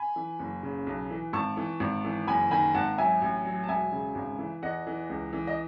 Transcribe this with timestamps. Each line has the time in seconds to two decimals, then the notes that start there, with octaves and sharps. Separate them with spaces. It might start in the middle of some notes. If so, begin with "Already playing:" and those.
Already playing: G#5 B5
0.16 E3
0.39 F#1
0.63 C#3
0.87 B1
1.11 E3
1.33 G#1 A5 C#6
1.57 E3
1.80 G#1
2.05 E3
2.27 F#1 G#5 B5
2.51 D#3 G#5 B5
2.75 G#1 F#5 A5
2.98 F#3 E5 G#5
3.22 A1
3.45 F#3
3.64 A5
3.68 E1 E5 G#5
3.92 C#3
4.15 G#1
4.39 E3
4.63 E2 D#5 F#5
4.87 E3
5.10 C#2
5.33 E3
5.47 D#5